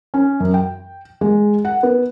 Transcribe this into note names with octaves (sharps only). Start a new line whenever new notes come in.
C#4
F#2
G5
G#3
F#5
B3